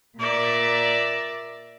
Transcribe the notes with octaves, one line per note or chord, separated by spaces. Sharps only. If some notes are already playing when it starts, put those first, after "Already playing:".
A#2 A#4 D5 E5 A6